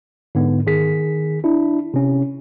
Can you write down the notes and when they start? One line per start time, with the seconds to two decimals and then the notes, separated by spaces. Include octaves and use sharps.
0.35 G#2 D3 B3
0.67 D#3 G#4 B6
1.44 D4 E4
1.94 C3 C#4